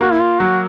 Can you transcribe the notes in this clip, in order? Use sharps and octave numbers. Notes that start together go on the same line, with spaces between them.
A#3 F#4
E4
F4
F#3 F#4